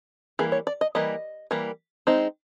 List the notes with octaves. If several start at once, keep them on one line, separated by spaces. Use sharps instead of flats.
E3 G3 A#3 G#4
C#5
D5
D#5
E3 G3 A#3 D#5
E3 G3 A#3
G#3 C4 D#4